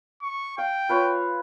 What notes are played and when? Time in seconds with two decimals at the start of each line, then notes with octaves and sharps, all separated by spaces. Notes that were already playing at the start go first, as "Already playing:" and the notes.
0.22 C#6
0.58 F5 G5
0.89 F4 B4 C#5